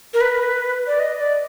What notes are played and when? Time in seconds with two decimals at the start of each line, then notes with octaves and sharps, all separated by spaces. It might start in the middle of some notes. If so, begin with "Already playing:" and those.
0.14 A#4
0.21 B4
0.87 D5
0.99 D#5
1.19 D5